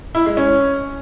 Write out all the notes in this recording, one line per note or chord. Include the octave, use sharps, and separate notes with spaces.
E4
G#3
C#4